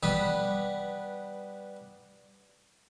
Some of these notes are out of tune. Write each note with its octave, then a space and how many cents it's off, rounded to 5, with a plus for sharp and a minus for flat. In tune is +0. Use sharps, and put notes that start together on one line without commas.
G3 +0 B3 +0 B4 -15